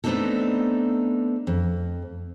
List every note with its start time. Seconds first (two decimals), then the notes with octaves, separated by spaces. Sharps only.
0.04 A3 B3 C4 D4 D#4 A4
1.47 F2